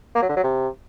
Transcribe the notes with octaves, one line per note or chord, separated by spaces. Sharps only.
A#3
F#3
D3
F#3
C3